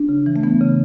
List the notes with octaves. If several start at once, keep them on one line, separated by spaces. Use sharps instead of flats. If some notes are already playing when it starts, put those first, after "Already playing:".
Already playing: D4
C#3
E3
A3
E3 B3
C#3